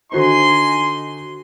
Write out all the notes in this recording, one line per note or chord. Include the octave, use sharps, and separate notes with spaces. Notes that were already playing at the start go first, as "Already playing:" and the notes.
D3 D#4 F#4 C5 G#5 C6